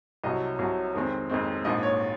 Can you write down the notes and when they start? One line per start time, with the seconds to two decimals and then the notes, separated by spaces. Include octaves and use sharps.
0.24 C2 C3 F#3 D#5
0.59 C2 C3 F#3
0.94 F2 D#3 G#3 C4
1.30 F2 D#3 G#3 C4
1.65 A#1 G#2 F3 A#3 D#5
1.83 C#5